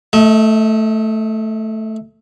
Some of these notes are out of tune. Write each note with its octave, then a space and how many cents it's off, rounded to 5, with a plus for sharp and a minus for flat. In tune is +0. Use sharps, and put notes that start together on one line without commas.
A3 +0 D#5 +40